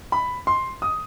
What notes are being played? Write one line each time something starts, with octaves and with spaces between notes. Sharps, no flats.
B5
C6
D#6